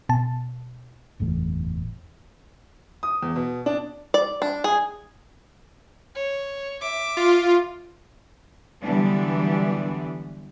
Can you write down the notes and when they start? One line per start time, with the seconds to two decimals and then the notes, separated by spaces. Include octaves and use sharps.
0.09 B2 A5
1.20 F#1 E2 A2
3.03 D#6
3.23 E2
3.36 B2
3.66 D4
4.14 D5
4.42 D4
4.64 G#4
6.15 C#5
6.81 E5 D6
7.17 F4
8.82 D3 E3 F#3 G3 B3 D4